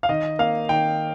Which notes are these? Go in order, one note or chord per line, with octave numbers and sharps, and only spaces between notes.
F5
D#3 D#5
A#3 F5
D#3 G5